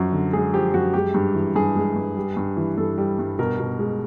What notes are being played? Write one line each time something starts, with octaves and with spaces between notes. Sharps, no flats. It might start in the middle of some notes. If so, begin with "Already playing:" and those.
Already playing: F#2 F3 F#4
D3
G#3 G#4
F3 G4
F#2 F#4
G#3 G4
G2
E3
G2 G#4
G#3
G2
G3
G2
E3
G2 A4
G3
G2
B2 A#4
B2
G#3